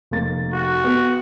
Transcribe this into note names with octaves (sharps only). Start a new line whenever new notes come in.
F1 A#3 A6
F#4
B3 G4